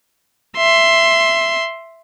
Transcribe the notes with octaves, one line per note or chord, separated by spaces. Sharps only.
E5 C6